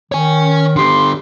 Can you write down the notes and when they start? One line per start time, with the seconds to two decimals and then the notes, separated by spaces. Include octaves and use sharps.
0.12 D#3 C#5 G#5
0.76 D3 G4 C6